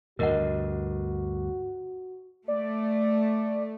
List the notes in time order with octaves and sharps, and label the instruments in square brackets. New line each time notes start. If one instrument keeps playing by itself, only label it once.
[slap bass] D2 G2 [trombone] F#4 [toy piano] A#4 D#5 F#5
[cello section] A3 [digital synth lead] D5